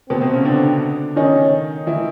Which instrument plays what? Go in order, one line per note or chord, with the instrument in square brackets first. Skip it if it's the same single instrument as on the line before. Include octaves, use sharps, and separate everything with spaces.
[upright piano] B2 B3 [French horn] C4
[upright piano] C3 C4
C#3 C#4
[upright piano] D3 D4 [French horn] C4
[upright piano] D#3 D#4 [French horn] C#4
[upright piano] E3 E4